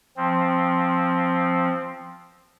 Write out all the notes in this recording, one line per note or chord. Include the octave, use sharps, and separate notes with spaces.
F3 C4